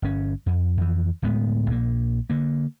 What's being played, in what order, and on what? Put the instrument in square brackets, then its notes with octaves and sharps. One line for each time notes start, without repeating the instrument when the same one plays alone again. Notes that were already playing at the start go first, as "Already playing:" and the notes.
[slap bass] G1 C#4
F2
F2 E3
D1 A2 G#3 B3
A#1 A#3
D3 A#3